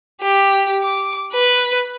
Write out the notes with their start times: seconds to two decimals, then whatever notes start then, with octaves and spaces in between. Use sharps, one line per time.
0.22 G4
0.83 D6
1.33 B4